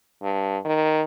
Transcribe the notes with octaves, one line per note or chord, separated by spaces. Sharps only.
G2
D#3